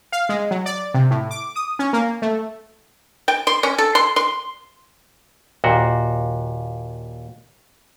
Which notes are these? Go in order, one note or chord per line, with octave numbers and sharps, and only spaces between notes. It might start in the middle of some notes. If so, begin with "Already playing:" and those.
F5
G#3
F#3
D5
C3
A2
D6
D#6
C#4
A#3
A3
G5
C6
C#4
A4
C6
C6
D#2 A#2 F#4